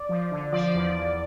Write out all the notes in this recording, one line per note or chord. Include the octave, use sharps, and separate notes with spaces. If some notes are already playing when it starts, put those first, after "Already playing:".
Already playing: D5
F3
D3
F3 D5
E2
E2